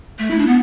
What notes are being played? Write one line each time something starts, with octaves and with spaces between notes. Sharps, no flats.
A3
E4
D4
B3